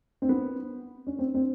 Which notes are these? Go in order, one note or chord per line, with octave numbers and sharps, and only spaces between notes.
C4
B3
C#4
C4
C4